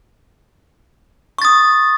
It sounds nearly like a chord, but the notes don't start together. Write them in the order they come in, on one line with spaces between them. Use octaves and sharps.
C#6 A6 D#6